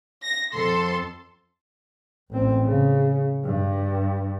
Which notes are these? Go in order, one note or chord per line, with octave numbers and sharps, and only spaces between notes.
A#6
F2 A4 C6
A1 C4
C#3
G2